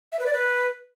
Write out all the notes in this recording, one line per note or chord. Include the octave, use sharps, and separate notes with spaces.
E5
B4
D5
B4